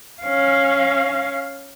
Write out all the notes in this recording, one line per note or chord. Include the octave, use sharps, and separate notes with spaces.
C#4 F5